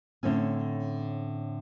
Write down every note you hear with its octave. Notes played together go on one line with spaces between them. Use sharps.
A2 D3 C4 C#4